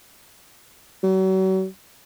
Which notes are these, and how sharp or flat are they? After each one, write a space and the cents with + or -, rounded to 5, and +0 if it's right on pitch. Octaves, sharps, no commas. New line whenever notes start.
F#3 +40